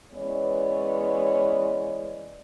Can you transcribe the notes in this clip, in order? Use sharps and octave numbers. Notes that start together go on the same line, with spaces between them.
E3 G#3 B3 C#4 C#5 D5